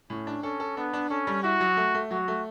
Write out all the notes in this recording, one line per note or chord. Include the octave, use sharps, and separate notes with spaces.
A2 C#4
D4
C#4 A4
A4
B3 D4
D4
C#4 A4
G3
E4 F#4
F#3
A3
A3
F#3 F#4
A3